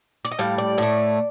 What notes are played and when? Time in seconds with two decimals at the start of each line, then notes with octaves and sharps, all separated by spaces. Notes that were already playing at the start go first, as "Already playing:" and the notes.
0.25 D5
0.31 D#5
0.39 A2 G3 F5
0.58 D5
0.78 A2 A3